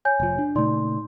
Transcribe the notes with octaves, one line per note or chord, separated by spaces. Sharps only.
C#5 G#5 G6
F1 F3
D4
A#2 C#3 A3 D#4 D5 C6